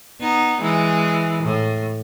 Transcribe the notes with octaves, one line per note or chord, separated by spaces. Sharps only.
B3 D#4
E3 G#3
A2